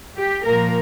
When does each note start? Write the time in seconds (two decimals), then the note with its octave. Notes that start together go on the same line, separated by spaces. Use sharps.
0.17 G4
0.45 A#2 F3 A#3 A#4